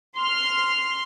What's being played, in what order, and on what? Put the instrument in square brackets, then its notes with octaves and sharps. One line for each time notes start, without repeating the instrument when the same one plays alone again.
[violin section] C6 F6